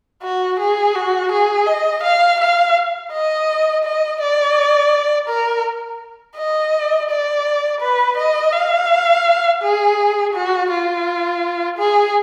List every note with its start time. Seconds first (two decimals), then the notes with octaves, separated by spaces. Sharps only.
0.23 F#4
0.60 G#4
0.95 F#4
1.32 G#4
1.67 D#5
2.03 F5
2.40 F5
3.12 D#5
3.84 D#5
4.20 D5
5.28 A#4
6.37 D#5
7.10 D5
7.81 B4
8.17 D#5
8.53 F5
9.62 G#4
10.34 F#4
10.71 F4
11.78 G#4